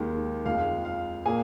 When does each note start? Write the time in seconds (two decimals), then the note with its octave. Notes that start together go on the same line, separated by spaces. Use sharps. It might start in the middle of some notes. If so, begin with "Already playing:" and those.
Already playing: D#2 D#3 G#3
0.46 F2 F3 G#3 F5
0.85 F5
1.25 A#2 A#3 G#4 G#5